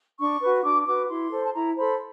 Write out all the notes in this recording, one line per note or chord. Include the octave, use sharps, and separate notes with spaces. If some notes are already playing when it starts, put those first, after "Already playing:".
D4 C#6
F#4 B4
D4 D6
F#4 B4 D6
E4 C6
A4 C5
A5
E4 A#5
A4 C5 B5